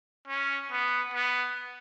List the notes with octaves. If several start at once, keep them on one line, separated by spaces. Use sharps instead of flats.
C#4
B3
B3